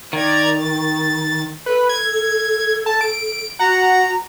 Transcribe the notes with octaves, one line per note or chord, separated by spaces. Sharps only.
D#3 D5 A#5 G#6
A6
A4 B4
G#6
A5
D7
F#4 F#5 A#5